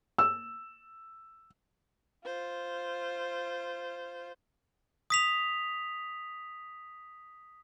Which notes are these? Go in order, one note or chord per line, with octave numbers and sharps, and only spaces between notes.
E6
F4 C5
D#6 B6 F7